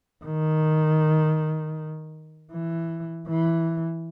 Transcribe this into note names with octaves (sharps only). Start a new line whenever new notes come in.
D#3
E3
E3